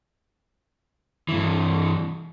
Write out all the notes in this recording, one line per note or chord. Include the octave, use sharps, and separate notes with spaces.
G2 E3